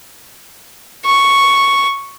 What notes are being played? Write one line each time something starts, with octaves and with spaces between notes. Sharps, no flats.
C#6